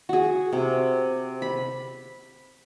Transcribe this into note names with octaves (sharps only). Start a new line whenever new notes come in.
F#4 G#4
C3
B5